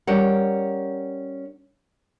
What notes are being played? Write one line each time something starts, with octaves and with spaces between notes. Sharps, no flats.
G3 C#4 A#4 F#5